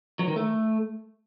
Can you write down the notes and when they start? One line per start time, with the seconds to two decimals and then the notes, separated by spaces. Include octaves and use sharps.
0.19 F#3
0.28 D#3
0.36 A3